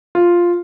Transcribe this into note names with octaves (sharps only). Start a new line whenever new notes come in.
F4